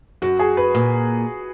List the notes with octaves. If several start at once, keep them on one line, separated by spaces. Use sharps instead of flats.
F#2 F#4
G#4
B4
A#2